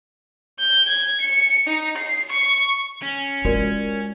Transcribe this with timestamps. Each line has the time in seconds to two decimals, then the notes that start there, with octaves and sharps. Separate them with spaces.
0.59 G6
0.88 G#6
1.21 C#7
1.67 D#4
1.97 C7
2.32 C#6
3.03 C#4
3.45 G#3 F4 F#4 A#4 D5